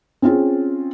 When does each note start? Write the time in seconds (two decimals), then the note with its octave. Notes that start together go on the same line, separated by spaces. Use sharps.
0.22 C4 C#4 F4 G#4